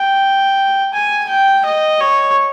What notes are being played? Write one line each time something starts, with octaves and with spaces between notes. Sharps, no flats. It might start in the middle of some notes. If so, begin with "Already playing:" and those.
Already playing: G5
G#5
G5
D#5
C#5